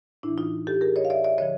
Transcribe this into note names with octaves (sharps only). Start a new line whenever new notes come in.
A2 E3 D4 E4
D#4 F4
G4 A4
G#4 A#4
C#5 D#5
F5
D5 E5
D5 E5
D3 F3 C#5 D#5